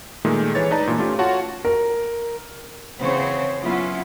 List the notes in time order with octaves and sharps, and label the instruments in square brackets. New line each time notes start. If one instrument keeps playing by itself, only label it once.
[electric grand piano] A#2 D#3 G#3 A3
E3 G#3 B4 C#5 A6
D#4 B4 D5 A5 A#5
G2 A#2 E3
A3 C#4 F4 G4
F4 F#4 C#5 F#5 A5
[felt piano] A#4
[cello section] C#3 E3 C4 F#4 C5 C#5
F#3 B3 C#4 E4 F4